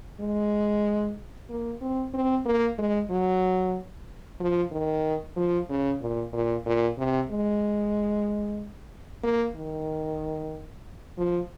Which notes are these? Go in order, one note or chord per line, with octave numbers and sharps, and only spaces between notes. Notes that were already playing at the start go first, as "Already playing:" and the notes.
G#3
A#3
C4
C4
A#3
G#3
F#3
F3
D#3
F3
C#3
A#2
A#2
A#2
C3
G#3
A#3
D#3
F3